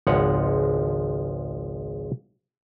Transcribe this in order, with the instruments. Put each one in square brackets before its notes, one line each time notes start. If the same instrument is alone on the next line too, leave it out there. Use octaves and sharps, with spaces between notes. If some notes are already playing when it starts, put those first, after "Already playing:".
[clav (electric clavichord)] G#1 C#2 F3 G#3 C#5 F#5